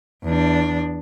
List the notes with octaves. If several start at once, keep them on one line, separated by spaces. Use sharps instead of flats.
E2 D4